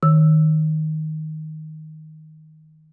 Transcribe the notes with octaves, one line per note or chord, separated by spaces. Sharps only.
D#3 E6